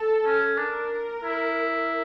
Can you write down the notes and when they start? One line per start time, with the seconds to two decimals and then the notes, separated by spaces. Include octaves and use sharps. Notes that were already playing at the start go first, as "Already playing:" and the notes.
Already playing: A4
0.25 C#4
0.58 D4 A#4
1.24 E4